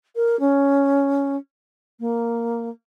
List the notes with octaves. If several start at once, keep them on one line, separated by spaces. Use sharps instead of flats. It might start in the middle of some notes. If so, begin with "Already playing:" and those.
A#4
C#4
A#3